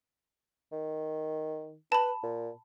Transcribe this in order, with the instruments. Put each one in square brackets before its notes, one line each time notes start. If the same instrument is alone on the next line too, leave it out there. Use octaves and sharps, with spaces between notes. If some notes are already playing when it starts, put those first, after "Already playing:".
[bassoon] D#3
[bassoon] B4 [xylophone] A5 B5
[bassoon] A#2